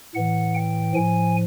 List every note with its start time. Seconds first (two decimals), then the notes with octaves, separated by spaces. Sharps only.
0.15 A2 E3 F#5
0.55 G5
0.94 A2 F3 G#5